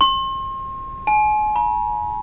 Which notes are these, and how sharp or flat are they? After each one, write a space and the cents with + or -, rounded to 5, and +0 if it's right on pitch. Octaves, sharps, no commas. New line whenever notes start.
C6 +40
G#5 +35
A#5 +40